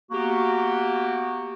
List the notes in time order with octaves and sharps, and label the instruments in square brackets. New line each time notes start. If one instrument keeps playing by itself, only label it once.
[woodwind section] A#3 B3 F#4 G4